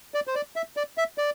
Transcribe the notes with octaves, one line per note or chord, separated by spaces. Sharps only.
D5
C5
D5
E5
D5
E5
D5